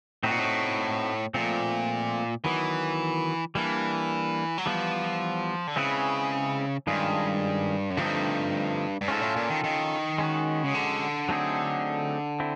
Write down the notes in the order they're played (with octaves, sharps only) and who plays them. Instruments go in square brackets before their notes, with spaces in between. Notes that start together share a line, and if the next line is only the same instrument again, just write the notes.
[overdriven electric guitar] A2 [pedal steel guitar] C4 D#4 F#4
[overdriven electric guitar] A#2
A2
[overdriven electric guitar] A#2 [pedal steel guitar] F3 A3 C4
[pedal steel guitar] D#3 F#3 B3 [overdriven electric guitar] E3
[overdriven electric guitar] E3 [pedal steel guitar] G3 A#3 D4
[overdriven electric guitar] F#3
[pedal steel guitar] E3 G3 B3 [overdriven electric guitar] F3
[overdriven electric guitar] D3
[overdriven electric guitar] C#3 [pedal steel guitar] G#3 C4 E4 G#4 B4
[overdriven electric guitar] G2 [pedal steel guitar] D#3 G#3 C#4 F4 G#4
[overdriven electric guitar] F#2
[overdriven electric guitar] G2 [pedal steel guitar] D3 F3 A3 C4 D#4
[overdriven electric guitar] G2
[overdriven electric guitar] G#2 [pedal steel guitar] C#4 F4 A4
[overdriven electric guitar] A2
A#2
D#3
D#3
[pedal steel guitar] G#3 C#4 F#4
[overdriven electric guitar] C#3
D3
[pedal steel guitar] F#3 A3 C4 D#4 G#4
C4 E4